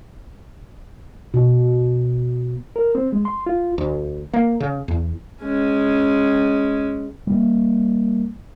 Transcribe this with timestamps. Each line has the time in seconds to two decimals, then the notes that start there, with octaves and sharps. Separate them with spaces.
1.34 B2
2.76 A#4
2.95 C4
3.12 G#3
3.25 C6
3.46 F4
3.78 D2
4.33 A#3
4.60 C#3
4.88 E2
5.43 G#3 C#4
7.27 G3 A#3